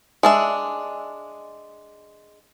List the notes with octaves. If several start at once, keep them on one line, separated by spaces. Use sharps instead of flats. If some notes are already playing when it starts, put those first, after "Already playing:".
G#3 D4 E5